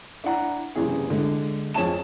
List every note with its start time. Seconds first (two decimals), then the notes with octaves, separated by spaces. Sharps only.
0.24 D4 E4 F#5 A#5
0.75 F#1 C3 E3 G#4
1.10 D3 G#3
1.74 F2 F3 G#4 C#5 A5 E7